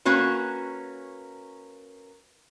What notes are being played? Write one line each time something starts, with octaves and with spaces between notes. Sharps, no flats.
A#3 C#4 F#4 B4